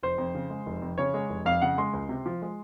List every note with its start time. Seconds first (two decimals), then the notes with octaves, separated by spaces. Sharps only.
0.03 F1 C5
0.18 F2
0.35 C#3
0.50 G#3
0.66 F1
0.82 F2
0.98 C#3 C#5
1.14 G#3
1.30 F1
1.45 F2 F5
1.62 C#3 F#5
1.78 G#3 C6
1.93 C#2
2.09 C3
2.26 F3
2.42 G#3